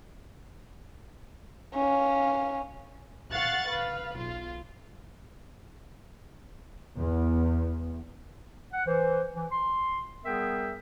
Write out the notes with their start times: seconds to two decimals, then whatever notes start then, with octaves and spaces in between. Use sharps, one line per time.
1.75 C#4 F5
3.31 F5 F#5 C#6 F#6 A6
3.67 B4 F5
4.17 B1 F4
6.98 E2
8.73 F#5
8.87 E3 C5
9.35 E3
9.52 C6
10.25 G3 B3 G#4 A#4 E5 G5